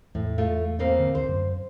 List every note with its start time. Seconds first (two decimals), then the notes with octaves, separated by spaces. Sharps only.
0.15 E2 A2
0.38 A3 F4
0.79 C#3 A#3 C4
0.99 D3
1.15 D2 C5
1.28 F#2